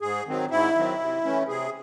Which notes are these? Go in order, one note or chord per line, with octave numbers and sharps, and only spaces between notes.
G#2 G#4
D#3 F#3 C4
G#2 E4
D#3 F#3 C4
C3
E3 A3 C#4
C3 G#4